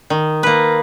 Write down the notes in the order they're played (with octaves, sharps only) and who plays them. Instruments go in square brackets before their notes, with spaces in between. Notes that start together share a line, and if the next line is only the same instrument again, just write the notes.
[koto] D#3
A#3 B4